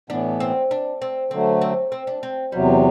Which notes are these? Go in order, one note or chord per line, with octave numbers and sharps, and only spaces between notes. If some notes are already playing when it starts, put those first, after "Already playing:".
A2 E3 B3 D4
C4
D4
C4
D3 F#3 A3 C4
C4
C4
D4
C4
E2 C3 F#3 G3